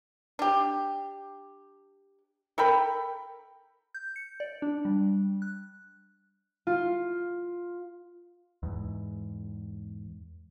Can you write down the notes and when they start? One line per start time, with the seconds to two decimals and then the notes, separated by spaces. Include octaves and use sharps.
0.39 D4 G4
2.58 A4 A#4 G5 B5
3.94 G6
4.16 C#7
4.40 D5
4.62 D4
4.85 G3
5.42 F#6
6.67 F4
8.63 E2 G#2